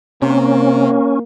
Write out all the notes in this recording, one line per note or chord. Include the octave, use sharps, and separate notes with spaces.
C3 A#3 C#4